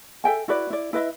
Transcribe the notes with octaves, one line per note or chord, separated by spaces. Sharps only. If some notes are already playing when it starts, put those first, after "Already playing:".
A4 E5 G5 G#5
E4 F#4 B4 D5
E4 D5
E4 B4 D#5 E5